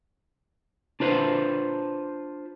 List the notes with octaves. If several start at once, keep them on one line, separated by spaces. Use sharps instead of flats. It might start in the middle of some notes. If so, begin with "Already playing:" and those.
D4 F4 B4 C5